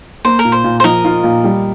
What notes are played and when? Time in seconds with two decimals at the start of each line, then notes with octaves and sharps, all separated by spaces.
0.25 A#3 C5
0.39 A#4
0.45 A#2
0.52 C5
0.64 A#2
0.80 C5
0.84 F3 A#4 D#5
1.05 F4
1.24 A#2
1.44 G3